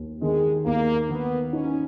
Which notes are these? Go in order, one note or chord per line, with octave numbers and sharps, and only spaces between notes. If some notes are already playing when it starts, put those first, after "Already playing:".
Already playing: D#2
D#3 G#3
D#2 A#3
D#3 B3
C#4 D#4